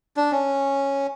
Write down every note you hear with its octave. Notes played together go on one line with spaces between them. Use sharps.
D4
C#4